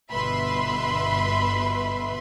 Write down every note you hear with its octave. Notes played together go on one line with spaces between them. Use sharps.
G1 B2 B4 E5 B5 C6